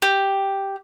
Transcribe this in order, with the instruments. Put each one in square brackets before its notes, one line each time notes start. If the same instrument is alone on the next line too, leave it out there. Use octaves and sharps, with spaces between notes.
[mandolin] G4